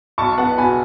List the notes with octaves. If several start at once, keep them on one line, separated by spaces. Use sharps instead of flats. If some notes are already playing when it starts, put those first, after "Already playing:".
B1 A5 C#6
B3 F#5 A5
B2 G#5 B5